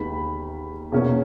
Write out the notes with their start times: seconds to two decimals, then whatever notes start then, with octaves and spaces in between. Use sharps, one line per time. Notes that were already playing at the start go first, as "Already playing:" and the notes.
Already playing: D#2 D#3 G#3 B3 B5
0.92 E2 B2 A#3 C#4